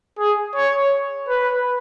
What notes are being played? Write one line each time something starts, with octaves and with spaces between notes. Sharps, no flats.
G#4
C#5
B4